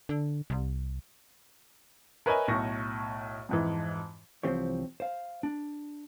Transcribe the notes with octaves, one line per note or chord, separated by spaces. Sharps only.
D3
C2
A#4 B4 C#5 D#5 E5 G#5
B1 A2 C#6 A#6
F2 G#2 E3
C2 E3 F3 C4 G4 C#5
C5 F5
D4